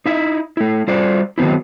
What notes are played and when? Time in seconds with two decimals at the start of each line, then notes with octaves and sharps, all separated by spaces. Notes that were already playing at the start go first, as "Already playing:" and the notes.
0.06 D#4 E4 E5
0.57 A3 E4
0.88 G3 F4 C5 D5
1.38 D#3 F#3 B3 C4 E4